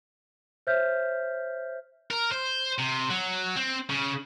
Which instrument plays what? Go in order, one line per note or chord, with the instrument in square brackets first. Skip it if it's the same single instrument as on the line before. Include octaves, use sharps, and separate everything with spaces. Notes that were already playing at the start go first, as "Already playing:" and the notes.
[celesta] C5 C#5 E5 F6 G6 B6
[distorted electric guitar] A#4
C5
C3
F#3
C4
C#3